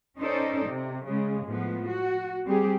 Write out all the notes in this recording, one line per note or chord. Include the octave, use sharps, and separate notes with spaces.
C#4 D#4 A4 C5 D5
C3
C#3 G#3
A2 F3 B3
F#4
G3 C4 G4 G#4